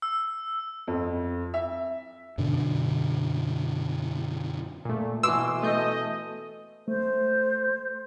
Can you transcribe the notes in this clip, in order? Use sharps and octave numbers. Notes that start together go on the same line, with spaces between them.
E6
F2
E5
F#2 B2 D3 D4
A#2 A3
B2 E3 C6 D6 E6 C7
A3 D#5 G6
A3 C5